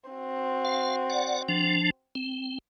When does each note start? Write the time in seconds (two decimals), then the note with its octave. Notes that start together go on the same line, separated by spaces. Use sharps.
0.10 C4 F#4
0.65 F5
1.10 D5 F#5
1.48 F3 D4
2.15 C4